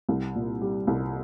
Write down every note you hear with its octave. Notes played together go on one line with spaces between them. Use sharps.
C2
A#2
G3
C2